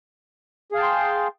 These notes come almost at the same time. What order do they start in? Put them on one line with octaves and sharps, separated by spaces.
G#4 F5 A5 G5 C6